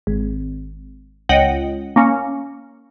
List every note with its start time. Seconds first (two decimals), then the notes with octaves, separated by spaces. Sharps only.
0.07 G#1
1.29 C#2 D#5 F#5 G5
1.96 A#3 C#4